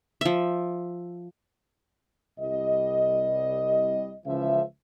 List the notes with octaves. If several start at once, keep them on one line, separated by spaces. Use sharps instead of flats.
F3 E5
C2 G3 D#5
C#2 C#3 E3 F3 E5